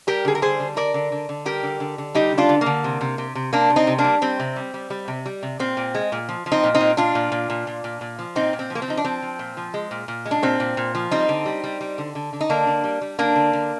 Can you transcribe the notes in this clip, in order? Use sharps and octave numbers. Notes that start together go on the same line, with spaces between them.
G3 G4 A#4
D3 G#4
A#4
G3 G#4 C5
D3
D3 A#4 D5
D3
D3
D3
G3 G4 A#4
D3
D3
D3
G3 D#4 G4
D3
D4 F4
D3
A#3
D3
C3
C3
C3
C3
C3 A#3 D4
C3
C4 D#4
C3
A#3 D4
G3
G3 C4
C3
G3
G3
G3
C3
G3
C3
A#2 C4
A#2
G#3
A#2
F3
F3
C4 D#4
A#2
C4 D#4
A#2
A#2 D4 F4
A#2
A#2
A#2
A#2
A#2
A#2
F3
A#2 C4 D#4
A#2
C4
F3
A#3
C4
F3 D#4
D4
F3 C4
F3
A#2
F3
G#3
A#2
A#2
G#3
D4
A#2 C4
A#2
A#2
F3
G3 C4 D#4
D3
G3
G3
G3
D3
D3
D3
D#4
D3 A#3 D4
D3
G3
G3
D3 A#3 D4
D3
D3